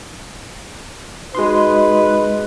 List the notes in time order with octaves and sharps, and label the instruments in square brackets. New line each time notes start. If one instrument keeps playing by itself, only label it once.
[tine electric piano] G#3 C6 [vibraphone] D#4 F#4 D#5 [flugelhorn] B4